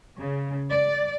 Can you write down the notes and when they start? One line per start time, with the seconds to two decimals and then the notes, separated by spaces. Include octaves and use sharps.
0.17 C#3
0.71 D5